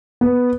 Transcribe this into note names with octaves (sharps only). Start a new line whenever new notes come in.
B3